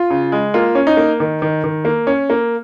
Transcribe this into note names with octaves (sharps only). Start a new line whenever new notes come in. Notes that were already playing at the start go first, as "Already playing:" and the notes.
Already playing: F4
C#3
G#3
A#3 F4
C#4
D#4
A#3
D#3
D#3
D#3
A#3
C#4
A#3